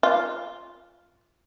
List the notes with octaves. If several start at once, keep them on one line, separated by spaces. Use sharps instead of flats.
F4